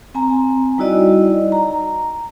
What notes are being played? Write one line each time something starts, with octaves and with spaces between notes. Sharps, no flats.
C4 G#5 A#5
G3 D#4 E4 F#4 D5 D#5
A#5